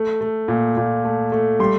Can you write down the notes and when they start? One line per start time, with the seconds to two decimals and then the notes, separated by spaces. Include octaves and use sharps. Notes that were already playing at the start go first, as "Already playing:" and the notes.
Already playing: A3
0.21 A3
0.48 A#2
0.77 A#2
1.04 A3
1.32 A3
1.59 G3 C6